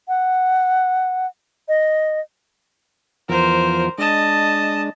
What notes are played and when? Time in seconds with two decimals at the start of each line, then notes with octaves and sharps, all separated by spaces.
0.08 F#5
1.68 D#5
3.29 E2 F3 A#4 C5
3.98 G#3 D4 D#5 A5